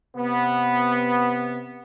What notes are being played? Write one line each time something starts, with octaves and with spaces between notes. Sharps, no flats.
C3 B3